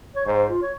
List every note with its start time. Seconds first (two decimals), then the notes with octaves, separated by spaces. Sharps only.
0.16 C#5
0.26 G#2 C5
0.49 F4
0.62 C#5